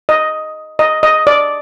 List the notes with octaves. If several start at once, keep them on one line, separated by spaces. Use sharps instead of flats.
D#5
D#5
D#5
D5